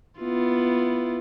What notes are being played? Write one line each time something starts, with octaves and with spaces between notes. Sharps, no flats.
B3 E4 F4